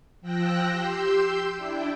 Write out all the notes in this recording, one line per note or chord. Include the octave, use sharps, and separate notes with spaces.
F3 G5 E6 F#6 A#6
G4 C6 E6 G6
D4 E4 G5